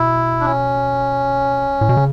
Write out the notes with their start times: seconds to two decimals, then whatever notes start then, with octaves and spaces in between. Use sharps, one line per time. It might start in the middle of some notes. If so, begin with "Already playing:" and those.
Already playing: B2 E4
0.40 D4
0.45 C#4
1.81 A2
1.89 B2
1.97 C#3